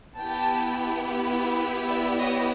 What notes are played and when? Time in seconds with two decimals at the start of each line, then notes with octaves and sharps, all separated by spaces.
0.16 B3 E4 G4 G5 A5
1.88 D5 E5
2.17 C#5 D#5